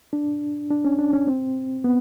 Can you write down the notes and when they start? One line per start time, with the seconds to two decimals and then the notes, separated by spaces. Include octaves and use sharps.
0.13 D4
0.70 D4
0.85 C#4
0.99 D4
1.13 C#4
1.27 C4
1.84 B3